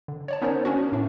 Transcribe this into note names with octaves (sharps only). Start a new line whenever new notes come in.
D3
C#5 D5 A5
B3 C#4 D#4 A#4 C5 C#5
A#3 C#4 D4 F#4
A2 D4 E5